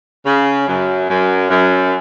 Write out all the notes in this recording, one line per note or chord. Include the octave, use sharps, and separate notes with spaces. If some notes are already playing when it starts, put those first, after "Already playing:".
C#3
F#2
F#2
F#2